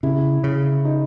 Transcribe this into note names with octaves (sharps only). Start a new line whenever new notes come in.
C#3 E4
C#3
D#4